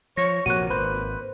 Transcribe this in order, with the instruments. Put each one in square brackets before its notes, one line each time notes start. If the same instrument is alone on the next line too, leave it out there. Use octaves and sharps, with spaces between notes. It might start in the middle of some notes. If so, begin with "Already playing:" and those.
[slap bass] F3 [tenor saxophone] C#5 [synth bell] A#6
[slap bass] A#1 C3 F3 [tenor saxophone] A#3 [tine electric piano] F#4 C#5 [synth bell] F#6 D#7
[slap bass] G#1 [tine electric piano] B4 C5